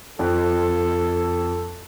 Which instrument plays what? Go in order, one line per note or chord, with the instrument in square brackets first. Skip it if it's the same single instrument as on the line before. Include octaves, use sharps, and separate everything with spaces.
[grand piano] F2 F#6 [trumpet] A4